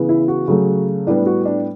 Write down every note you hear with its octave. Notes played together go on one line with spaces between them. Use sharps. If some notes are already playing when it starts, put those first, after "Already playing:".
Already playing: C#3 E3 B3
E4
F#4
C#3 F#3 A3
A2 G3 B3 D4
F#4
D4